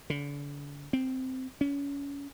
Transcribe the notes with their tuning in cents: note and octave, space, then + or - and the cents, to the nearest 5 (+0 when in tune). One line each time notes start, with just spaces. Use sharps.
D3 -35
C4 -10
C#4 +30